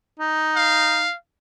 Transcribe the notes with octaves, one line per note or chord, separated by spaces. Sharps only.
D#4
F5